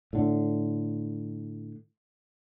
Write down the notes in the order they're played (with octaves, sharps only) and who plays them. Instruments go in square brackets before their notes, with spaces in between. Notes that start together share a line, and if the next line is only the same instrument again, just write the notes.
[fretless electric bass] A2 D3